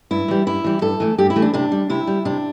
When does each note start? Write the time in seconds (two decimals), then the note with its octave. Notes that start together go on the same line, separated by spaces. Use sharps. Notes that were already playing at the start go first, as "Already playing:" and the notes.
0.11 G2 E4
0.28 E3 G3
0.47 G2 E4
0.64 E3 G3
0.82 G2 A4
1.00 E3 A3
1.18 G2 G4
1.30 E4
1.36 E3 A3
1.42 D4
1.54 C3 D4
1.72 G3
1.90 C3 E4
2.07 G3
2.25 C3 D4